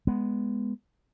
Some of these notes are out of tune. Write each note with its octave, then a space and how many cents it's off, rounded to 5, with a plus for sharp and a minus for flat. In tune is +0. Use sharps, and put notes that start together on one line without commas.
G#3 +0 B3 +0